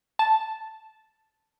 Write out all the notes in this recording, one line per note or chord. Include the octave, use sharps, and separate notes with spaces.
A5